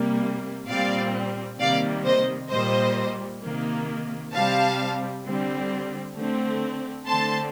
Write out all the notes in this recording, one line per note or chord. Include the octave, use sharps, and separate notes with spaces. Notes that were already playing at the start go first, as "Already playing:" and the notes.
Already playing: C3 G3 A#3
A#2 G3 C4 D5 F5
C3 D#3 G3 A#3 D5 F5
C5 D#5
A#2 G3 A#3 C5 D#5
C3 D#3 A#3
C3 G3 C4 F5 A5
D3 G3 C4
D3 A3 C4
D3 A3 C4 A5 C6